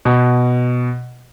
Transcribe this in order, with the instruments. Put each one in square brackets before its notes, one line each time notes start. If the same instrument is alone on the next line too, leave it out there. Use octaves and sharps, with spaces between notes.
[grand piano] B2